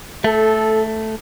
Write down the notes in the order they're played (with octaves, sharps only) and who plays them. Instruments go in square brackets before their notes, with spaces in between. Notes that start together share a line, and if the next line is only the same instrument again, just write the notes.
[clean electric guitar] A3 [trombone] A4